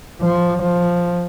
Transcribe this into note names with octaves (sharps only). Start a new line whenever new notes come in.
F3
F3